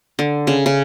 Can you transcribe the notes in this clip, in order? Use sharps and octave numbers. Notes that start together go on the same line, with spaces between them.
D3
C#3
C#3